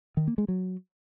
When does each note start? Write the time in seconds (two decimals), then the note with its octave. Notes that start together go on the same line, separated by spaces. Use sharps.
0.17 D#3
0.27 A#3
0.38 G#3
0.48 F#3